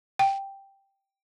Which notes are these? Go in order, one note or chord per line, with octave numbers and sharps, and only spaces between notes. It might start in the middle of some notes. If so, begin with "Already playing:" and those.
G5